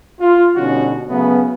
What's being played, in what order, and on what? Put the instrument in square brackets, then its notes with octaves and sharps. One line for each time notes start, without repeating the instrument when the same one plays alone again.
[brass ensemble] F4
B2 D3 G3 C#4 D#4 F#4
C#3 F#3 A3 B3